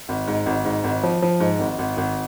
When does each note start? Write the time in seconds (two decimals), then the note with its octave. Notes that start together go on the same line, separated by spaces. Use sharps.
0.09 G#1
0.28 G#2
0.46 G#1
0.65 G#2
0.84 G#1
1.03 F3
1.22 F3
1.40 G#2
1.59 G#1
1.79 G#1
1.97 G#1